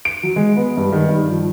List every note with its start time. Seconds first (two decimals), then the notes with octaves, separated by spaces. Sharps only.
0.05 D7
0.23 F#3
0.36 G#3
0.56 B3
0.77 G2
0.92 D#3
1.09 G2
1.30 F3